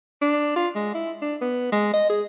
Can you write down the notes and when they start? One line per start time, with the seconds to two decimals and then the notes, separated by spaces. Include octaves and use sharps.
0.21 D4
0.56 F4
0.75 G#3
0.94 E4
1.22 D4
1.41 B3
1.72 G#3
1.93 D#5
2.09 G#4